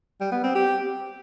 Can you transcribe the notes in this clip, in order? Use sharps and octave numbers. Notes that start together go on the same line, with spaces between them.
G3
B3
C4
G4